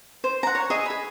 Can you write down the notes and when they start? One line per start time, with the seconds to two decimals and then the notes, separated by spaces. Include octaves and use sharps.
0.24 C5
0.43 F#5 A#5
0.55 C#5
0.70 G#4 D#5 E5
0.86 G#4 B5